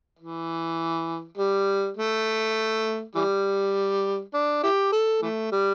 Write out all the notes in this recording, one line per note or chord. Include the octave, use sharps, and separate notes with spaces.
E3
G3
A3
E3 G3
D4
E4 G4
A4
E3 A3
G3